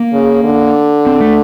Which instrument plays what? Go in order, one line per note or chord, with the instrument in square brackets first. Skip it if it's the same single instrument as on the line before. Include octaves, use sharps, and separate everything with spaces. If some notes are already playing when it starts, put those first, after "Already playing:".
Already playing: [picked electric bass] A#3
[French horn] C#3
D3
[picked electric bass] C4
A3